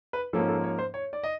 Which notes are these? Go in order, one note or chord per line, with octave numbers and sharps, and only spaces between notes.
B4
G#2 F3 A#3 C#4 A4
A4
C#5
C5
C#5
D5
D#5